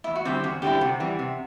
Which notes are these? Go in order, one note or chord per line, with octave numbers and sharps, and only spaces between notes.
E2 E4
F#4
D3 G3 C4 E4 G4
E2 F#4
D3 G3 C4 E4 G4
C3 F#4
E3 G3
C3